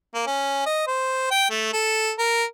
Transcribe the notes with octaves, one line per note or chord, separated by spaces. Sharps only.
A#3
C#4
D#5
C5
G5
A3
A4
A#4